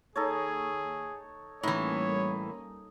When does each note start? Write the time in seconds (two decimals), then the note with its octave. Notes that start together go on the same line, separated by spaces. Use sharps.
0.16 D#2 D#4 G#4 A4 C#5
1.63 A2 E3 G3 A#3 C#4 D#4 C#5